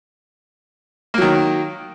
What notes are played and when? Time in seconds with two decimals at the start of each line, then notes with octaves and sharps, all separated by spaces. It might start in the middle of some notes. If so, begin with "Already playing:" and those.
1.14 A#3
1.18 F#3
1.22 D#3